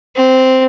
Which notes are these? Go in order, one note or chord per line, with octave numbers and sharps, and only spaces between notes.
C4